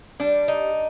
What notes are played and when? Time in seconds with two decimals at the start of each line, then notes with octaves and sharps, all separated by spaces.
0.20 G3 D4
0.48 D#4